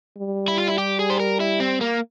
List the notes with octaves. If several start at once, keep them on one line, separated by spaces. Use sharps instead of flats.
G3
E4
F4
E4
G4
G#4
C5
A#4
E4
C4
A#3